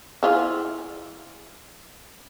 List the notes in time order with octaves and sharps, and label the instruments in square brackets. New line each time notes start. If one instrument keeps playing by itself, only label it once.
[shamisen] E4 F4 G#4